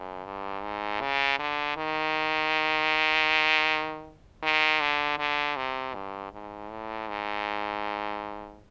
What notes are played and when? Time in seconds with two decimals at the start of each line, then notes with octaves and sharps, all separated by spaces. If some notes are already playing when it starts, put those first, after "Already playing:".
Already playing: F#2
0.25 G2
0.63 G#2
1.01 C#3
1.39 D3
1.77 D#3
4.43 D#3
4.81 D3
5.19 D3
5.57 C3
5.95 G2
6.32 G#2
6.71 A2
7.08 G#2